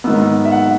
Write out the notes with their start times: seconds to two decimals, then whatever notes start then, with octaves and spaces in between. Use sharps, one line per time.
0.04 G#2 D#3 F#3 B3 E6
0.45 E5
0.52 F#5